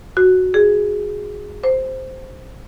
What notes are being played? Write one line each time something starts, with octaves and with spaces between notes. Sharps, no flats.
F#4
G#4
C5